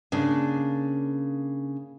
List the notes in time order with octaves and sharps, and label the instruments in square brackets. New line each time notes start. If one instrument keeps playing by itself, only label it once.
[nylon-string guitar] C#3 A#3 D4